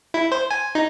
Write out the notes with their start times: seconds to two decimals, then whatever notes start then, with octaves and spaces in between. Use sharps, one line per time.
0.14 E4
0.32 C5
0.51 G#5
0.75 D#4